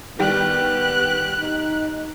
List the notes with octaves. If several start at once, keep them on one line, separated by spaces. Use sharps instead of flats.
D#3 G3 B3 G4 G5 F#6
D#4